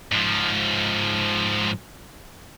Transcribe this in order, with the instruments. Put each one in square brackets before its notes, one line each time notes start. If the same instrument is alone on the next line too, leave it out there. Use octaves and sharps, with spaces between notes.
[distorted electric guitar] G#2 F3